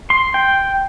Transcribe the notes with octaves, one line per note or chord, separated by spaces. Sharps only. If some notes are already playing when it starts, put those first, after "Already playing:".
C6
G5